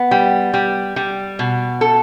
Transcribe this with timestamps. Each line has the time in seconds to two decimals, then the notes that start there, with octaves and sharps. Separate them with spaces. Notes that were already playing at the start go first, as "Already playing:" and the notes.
Already playing: B3
0.11 G3
0.54 G3
0.96 G3
1.39 B2
1.81 A4